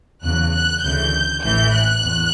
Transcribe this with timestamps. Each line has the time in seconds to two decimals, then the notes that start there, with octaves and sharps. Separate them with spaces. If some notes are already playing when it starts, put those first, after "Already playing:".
0.23 E2 C#3 F#3 F#6
0.54 F#6
0.83 D2 C#3 E3 G6
1.43 A1 A2 E3 G6
1.73 F#6
2.04 E2